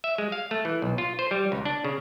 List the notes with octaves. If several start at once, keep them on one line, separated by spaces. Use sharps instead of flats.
E5
G#3
F5
A3
E3
B1
F4
C5
G3
C#2
D4
C#3